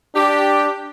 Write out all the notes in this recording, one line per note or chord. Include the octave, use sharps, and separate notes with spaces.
D4 G4